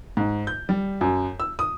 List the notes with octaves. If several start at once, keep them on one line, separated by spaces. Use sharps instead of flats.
G#2
G6
G3
F#2
E6
D#6